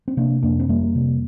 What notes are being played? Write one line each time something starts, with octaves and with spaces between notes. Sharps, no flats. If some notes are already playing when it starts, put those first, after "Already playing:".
C4
C3 A#3 D4
F2 A#3 D4
C4
F2 G3 A#3
C3